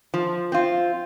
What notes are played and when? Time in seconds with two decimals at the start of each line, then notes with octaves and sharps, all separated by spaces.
0.14 F3
0.52 C4 F4